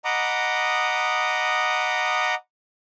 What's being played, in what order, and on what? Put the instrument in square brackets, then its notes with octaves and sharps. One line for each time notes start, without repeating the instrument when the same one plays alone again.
[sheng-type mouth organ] D#5 F#5 A#5 B5 D6 D#6